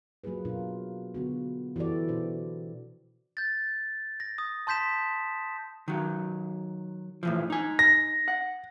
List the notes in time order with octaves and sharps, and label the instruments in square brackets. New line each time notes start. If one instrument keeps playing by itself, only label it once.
[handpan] F#3 A#3 F4 G#4 B4
B2 D4 F4 A#4
D3 B3 F#4
E3 F#4 G4 A4 D5
B2 D4 F#4 C5
[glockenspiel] G6 A6
A#6
D#6
A5 C6 G6 B6 E7
[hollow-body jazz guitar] D#3 F#3
A2 E3 F3
D#4 G#5
[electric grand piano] A#6
[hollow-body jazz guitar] F#5